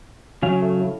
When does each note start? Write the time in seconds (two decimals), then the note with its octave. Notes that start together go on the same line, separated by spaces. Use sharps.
0.42 C#3 F#3 C#4 F5
0.61 A3
0.80 A2